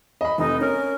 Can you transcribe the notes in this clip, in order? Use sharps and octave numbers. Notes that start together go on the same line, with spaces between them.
D#5 B5
F1 D#4
C#4 A#4